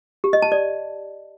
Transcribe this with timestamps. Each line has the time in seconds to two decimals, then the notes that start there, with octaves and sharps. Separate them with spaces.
0.24 G4
0.33 D#5
0.42 A5
0.52 D5